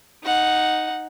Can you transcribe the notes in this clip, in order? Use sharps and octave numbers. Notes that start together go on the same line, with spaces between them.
D#4 F#5